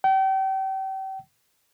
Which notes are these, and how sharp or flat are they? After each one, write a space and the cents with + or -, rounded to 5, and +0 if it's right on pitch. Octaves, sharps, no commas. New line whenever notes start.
G5 -35